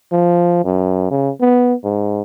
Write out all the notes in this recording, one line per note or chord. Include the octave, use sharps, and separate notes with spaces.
F3
F#2
C#3
B3
G#2